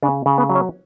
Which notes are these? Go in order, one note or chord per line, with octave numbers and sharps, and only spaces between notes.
C#3 D4
C#3
B3
F#3
C#4